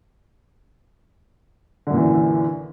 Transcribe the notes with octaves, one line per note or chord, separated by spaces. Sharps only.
F#2 A#2 D3 E3